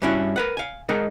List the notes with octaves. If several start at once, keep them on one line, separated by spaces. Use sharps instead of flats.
G2 G3 C#4 E4 F#4
A#4 B4 F#5
F5 G#5
G#3 D#4 A#4 F#5